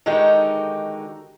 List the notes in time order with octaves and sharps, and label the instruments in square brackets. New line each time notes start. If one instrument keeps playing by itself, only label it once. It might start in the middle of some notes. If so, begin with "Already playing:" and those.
[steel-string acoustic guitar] D3 D#3 G#3 D#4 F#4 G4